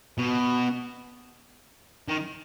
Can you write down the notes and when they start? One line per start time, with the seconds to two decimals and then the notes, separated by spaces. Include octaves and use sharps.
0.18 B2
2.08 D#3